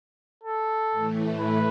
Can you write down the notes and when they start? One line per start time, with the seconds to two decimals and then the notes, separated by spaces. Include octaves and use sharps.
0.44 A4
0.91 A2 E3 A3
1.38 B4